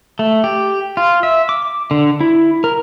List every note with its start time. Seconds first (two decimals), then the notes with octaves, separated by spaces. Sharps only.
0.19 A3
0.44 G4
0.97 F4
1.23 E5
1.49 D6
1.91 D3
2.21 E4
2.64 A#4